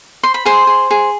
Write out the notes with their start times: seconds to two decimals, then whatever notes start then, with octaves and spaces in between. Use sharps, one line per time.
0.23 C5 C6
0.34 B5
0.45 G#4 C5 C6
0.67 G#4
0.91 G#4